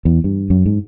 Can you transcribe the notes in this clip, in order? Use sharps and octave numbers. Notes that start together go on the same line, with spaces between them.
E2
G2
F#2
G#2